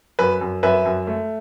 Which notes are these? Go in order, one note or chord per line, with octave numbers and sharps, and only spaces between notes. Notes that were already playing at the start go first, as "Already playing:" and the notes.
F#2 B4
F#2
F#2 B4 E5
F#2
A3